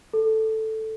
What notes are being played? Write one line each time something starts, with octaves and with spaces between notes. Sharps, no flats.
A4